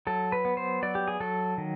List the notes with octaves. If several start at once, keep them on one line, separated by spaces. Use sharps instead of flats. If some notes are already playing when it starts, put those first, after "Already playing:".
F#3 A4
B4
B3
C5
F#3 D5
G4
G#4
F#3 A4
D#3